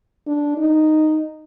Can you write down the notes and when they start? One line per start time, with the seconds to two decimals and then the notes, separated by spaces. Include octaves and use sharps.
0.27 D4
0.58 D#4